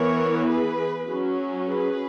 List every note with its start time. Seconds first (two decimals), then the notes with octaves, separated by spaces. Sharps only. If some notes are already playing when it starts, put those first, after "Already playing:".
Already playing: E3 B3 A#4 C#5
0.48 G#4 B4
1.08 F#3 C#4
1.68 G#4 B4